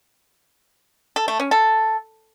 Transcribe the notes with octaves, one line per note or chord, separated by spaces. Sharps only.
A4
A3
C#4
A4